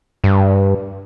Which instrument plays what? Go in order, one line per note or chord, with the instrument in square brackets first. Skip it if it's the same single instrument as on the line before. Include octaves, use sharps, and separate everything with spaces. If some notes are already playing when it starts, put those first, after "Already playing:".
[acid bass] G2